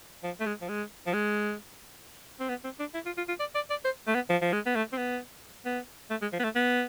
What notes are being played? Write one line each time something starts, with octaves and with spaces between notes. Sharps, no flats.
F3
A3
G#3
F3
G#3
F3
G#3
C4
B3
C4
D4
E4
F4
F4
F4
D5
D5
D5
C5
A3
B3
F3
F3
G#3
B3
A3
C4
B3
B3
A3
G#3
F3
B3
A3
B3